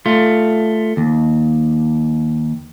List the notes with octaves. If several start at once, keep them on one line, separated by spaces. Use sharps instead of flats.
A3 F4
D#2